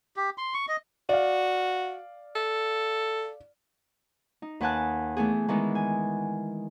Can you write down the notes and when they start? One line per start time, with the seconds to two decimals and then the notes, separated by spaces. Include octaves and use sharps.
0.16 G4
0.38 C6
0.54 C#6
0.68 D#5
1.09 F#4 D5 F5
2.36 A4
4.42 D#4
4.60 D#2 B4 F#5 G#5 A5 F#6
5.17 E3 A3 B3 G#4
5.48 D#3 E3 G#3 B3 D#4
5.75 G#5